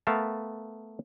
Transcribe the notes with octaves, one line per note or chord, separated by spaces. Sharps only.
A3 B3 A#4 F5 A5